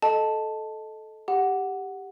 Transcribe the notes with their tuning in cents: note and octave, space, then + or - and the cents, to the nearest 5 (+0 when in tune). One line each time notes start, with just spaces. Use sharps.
A4 -15 D#5 +0 A5 +0
G4 +5 F#5 +0